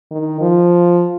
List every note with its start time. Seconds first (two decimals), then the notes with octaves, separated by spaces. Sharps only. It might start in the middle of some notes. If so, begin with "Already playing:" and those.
0.12 D#3
0.41 F3